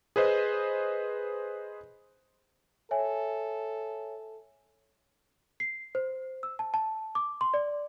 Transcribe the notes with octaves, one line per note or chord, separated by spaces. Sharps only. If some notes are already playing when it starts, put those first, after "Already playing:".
G#4 B4 C5 D#5
A4 C#5 E5 G#5
C7
C5
E6
A5
A5
D6
C6
D5